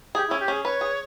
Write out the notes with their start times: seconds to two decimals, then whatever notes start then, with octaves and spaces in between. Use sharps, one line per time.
0.15 G4 G#4
0.28 C#4 E4
0.40 G4
0.48 C#4 G#4
0.65 B4 C#5
0.81 G#4